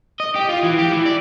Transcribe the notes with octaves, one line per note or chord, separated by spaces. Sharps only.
D#5
G4
F4
E3
G4
E3
D5